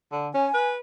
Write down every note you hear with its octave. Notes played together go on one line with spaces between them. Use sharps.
D3
C#4 G#5
B4